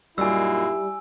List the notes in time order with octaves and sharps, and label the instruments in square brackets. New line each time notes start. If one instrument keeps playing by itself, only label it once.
[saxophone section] F#2 A#2 D#4 [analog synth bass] G3 [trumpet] E4 [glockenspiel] G#5 E6